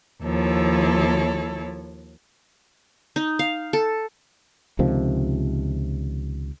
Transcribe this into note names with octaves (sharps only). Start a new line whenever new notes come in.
D#2 F3 E4 A4 C#5
D#4
F5
A4
C#2 C3 D#3 F3